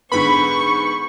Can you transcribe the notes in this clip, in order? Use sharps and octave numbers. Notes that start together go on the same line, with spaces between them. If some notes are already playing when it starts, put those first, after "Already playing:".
G#2 D3 B3 B5 C#6